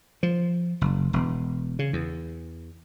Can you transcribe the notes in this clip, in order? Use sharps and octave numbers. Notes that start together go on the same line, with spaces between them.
F3
F#1
E1
C#3
E2